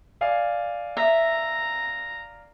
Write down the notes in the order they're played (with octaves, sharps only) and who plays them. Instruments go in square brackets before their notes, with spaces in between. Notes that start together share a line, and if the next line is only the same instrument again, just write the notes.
[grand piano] D5 F5 G#5
[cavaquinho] E5 [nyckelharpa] A#5